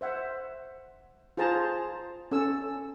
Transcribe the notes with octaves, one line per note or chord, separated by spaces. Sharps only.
C5 E5 F#5
F4 G#4 C5 A5 A#5
C#4 A4 E6